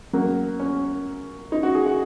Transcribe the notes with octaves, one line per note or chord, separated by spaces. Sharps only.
F#2 C#3 F#3 A#3
C#4
D#4
F#4
G#4
F#4